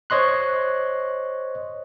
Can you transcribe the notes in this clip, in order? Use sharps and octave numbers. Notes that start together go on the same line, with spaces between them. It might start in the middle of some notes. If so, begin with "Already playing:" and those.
C5 C#5 D#5 C6 F#6